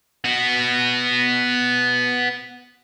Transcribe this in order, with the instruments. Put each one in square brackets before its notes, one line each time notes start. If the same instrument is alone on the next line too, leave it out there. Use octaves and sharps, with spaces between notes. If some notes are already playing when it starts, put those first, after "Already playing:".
[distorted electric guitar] B3 F#4